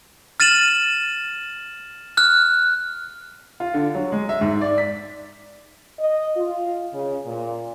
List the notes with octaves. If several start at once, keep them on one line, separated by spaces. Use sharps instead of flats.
F6 A6 D#7 E7 F#7
F6 F#6
F4
D3
F#3
G#3
E5
G#2
D5
B6
D#5
F4
C#3
A#2